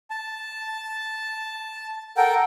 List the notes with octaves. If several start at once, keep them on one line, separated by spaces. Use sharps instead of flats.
A5
A4 A#4 F#5 G5